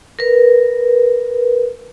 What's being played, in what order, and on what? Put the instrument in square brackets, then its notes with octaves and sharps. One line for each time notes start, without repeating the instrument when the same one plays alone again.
[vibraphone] A#4 B4